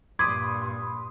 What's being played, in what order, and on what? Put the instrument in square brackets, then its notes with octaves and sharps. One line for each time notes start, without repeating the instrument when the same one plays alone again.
[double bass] G2 A#2 [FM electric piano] B5 C6 D#6 [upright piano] D6 [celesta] G#6